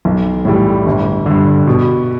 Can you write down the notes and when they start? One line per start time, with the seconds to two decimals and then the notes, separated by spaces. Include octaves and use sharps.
0.05 B1
0.45 A2 E3 G3
0.86 G1
1.26 G2 D3
1.67 B2